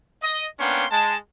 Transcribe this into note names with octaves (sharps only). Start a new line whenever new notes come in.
D#5
A#3 B3 C#4 D4 G5 C6
G#3 A5